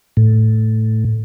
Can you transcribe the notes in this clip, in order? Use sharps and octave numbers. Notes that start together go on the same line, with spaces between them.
A2